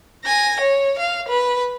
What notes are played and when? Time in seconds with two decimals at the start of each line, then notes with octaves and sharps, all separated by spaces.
0.25 G#5 A#6
0.60 C#5
0.99 F5
1.28 B4